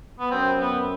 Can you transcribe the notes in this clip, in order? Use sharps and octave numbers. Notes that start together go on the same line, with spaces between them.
B3
F#2 C4
B3